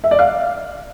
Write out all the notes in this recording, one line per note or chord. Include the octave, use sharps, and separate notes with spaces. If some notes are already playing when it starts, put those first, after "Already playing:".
E5
D5
F5